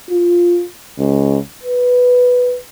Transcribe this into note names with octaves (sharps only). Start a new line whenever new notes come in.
F4
C#2
B4